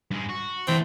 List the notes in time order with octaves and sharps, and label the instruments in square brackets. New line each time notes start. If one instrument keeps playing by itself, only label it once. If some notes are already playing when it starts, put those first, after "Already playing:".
[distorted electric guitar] G2 G#3
F#4
[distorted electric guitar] D3 A3 [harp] E3 [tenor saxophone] C4